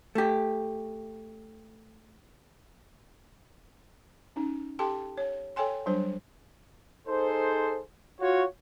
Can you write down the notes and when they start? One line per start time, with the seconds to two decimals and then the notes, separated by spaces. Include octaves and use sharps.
0.15 A3 G4
4.36 C#4 D#4
4.79 G4 A4 G5 A5 C6
5.17 C#5
5.56 A4 C#5 G5 G#5 C6
5.86 F#3 G3 D4 C5
7.07 D#4 G#4 A4 C5
8.21 F4 F#4 C#5